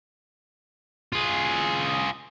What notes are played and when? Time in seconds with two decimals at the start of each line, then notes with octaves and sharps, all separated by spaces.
1.13 F4 G#4